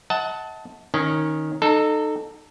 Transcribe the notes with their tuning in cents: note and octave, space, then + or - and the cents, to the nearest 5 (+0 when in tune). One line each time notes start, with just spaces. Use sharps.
D#5 +40 F#5 +0 A5 +0
D#3 +0 C#4 -10
D#4 -25 A4 +0